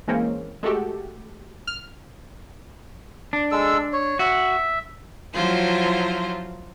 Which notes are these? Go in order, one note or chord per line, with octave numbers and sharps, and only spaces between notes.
E3 G#3 A#3 C4 C#4
G#3 A3 F#4 G4 A4
F6
D4
G#3 A4 E6
C#5
F#4 E5
F3 F#3 E4 F4 C5